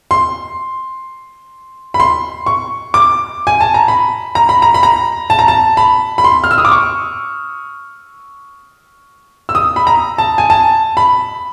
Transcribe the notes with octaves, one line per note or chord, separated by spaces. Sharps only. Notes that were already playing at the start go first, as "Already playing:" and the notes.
C6
B5
C6
C#6
D6
G#5
A5
A#5
B5
A#5
B5
A#5
B5
A#5
A5
A#5
A5
B5
B5
C6
F6
E6
D#6
D6
C#6
E6
D#6
B5
A#5
A5
G#5
A5
B5